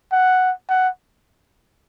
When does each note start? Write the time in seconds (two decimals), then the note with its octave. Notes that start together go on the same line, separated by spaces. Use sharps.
0.12 F#5
0.69 F#5